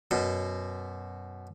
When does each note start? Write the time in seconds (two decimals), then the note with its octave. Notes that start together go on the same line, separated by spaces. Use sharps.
0.11 F#2 B2